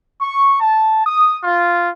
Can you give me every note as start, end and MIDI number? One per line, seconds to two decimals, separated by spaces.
0.21 0.55 85
0.61 1.02 81
1.05 1.38 87
1.44 1.90 65